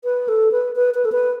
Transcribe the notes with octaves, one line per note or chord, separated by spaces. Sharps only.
B4
A4
B4
B4
B4
A4
B4